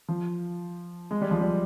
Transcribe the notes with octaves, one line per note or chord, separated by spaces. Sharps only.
F3
G#3
G3
F3
G3